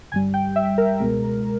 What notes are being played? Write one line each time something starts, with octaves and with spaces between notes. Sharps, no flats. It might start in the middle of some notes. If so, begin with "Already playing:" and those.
G1 G2 G3 G#5
G5
E5
A#4
C#2 B2 G#3